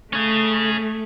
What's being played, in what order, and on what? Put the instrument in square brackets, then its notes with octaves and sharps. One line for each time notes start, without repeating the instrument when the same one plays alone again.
[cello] A3 [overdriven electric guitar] C#4 G#4